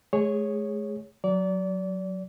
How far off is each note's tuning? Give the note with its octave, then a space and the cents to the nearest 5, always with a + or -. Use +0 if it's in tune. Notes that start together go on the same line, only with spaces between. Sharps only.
G#3 +45 G#4 -15 C#5 +0
F#3 +0 D5 -30